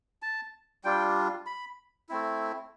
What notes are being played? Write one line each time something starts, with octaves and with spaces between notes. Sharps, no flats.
A5
G3 D4 F4 G5
B5
A3 C4 E4